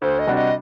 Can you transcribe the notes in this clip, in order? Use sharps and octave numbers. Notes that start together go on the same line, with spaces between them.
D2 C5
D#5
C3 G3 D4 F#4
D#5